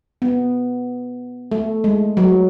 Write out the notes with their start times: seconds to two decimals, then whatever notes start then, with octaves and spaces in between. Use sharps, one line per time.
0.22 B3
1.52 A3
1.84 G#3
2.17 F#3